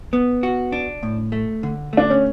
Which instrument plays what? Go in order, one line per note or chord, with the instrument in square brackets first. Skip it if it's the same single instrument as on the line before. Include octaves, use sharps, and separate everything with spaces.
[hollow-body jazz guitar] B3
F#4
D4
A2
A3
D3
[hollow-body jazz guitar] A3 [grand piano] D4
[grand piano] C#4